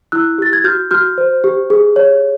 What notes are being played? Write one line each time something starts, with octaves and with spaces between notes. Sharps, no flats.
E4 E6 F#6
G4 A6
G#6
F#4 F6 G6
F#4 F6 G6
C5
G4
G#4
C#5